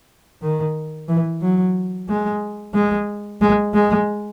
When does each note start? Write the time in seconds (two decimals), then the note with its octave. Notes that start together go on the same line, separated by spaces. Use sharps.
0.42 D#3
1.08 E3
1.41 F#3
2.09 G#3
2.74 G#3
3.41 G#3
3.74 G#3